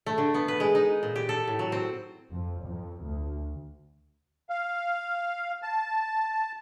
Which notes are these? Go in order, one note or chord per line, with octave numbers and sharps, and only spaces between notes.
A3
D3
B3
B4
G#3
D#4
A#2
G4
A4
A2
F#3
C4
F2
F2
D2
F5
A5